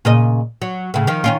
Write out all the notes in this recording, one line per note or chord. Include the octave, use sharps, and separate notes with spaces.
A#2 C#3 D#5
F#3
A2 C#3
D#3 F3
D#3 C#4 F4